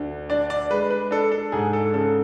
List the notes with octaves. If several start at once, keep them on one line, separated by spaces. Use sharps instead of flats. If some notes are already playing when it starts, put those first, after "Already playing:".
Already playing: D2
D4 D5
D5
G#3 B4
B4
D4 A4
A4
G#2 G#4
A4
C#3 A4